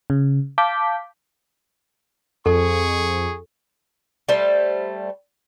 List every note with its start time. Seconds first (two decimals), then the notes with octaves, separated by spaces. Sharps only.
0.10 C#3
0.58 F5 A5 D6 G6 B6
2.46 F2 G#4 A4 C#6
4.29 G3 A3 C5 A5